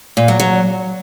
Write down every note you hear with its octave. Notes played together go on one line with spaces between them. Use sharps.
A#2
F#3
F#3